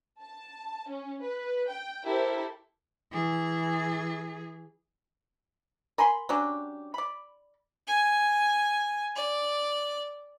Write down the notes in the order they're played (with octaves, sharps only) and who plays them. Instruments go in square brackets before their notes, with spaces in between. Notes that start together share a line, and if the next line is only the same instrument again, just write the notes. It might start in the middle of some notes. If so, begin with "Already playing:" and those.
[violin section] A5
C#4
B4
G5
E4 G4 A4 A#4 C5
[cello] E3 G#4
[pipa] A#4 G#5 B5 C6
F#3 C#4 D4 G4
D5 B5
[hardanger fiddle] G#5
D5